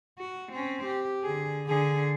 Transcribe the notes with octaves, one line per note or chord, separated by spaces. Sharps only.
F#4
C4 C#4
G4
D3 G#4
D3 G#4